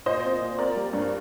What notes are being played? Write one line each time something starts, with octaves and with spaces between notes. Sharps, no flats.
A#2 C5 D#5
C4
A#2
C4 A#4 D5
G3
G2